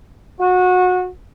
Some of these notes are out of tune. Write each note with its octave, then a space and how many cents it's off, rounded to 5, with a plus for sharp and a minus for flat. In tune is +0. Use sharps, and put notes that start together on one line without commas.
F#4 -25